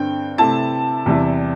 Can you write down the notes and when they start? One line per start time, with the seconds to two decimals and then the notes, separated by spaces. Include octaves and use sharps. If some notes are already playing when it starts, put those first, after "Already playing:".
Already playing: G2 D3 C4 G5
0.38 C3 A3 C4 E4 A5
1.06 E2 C3 G3 E4